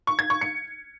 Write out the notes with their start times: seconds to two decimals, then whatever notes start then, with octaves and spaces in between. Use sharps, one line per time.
0.07 C#6
0.19 G#6
0.30 C#6
0.41 C#7